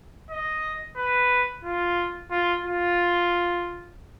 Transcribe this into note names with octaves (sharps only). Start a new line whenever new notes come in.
D#5
B4
F4
F4
F4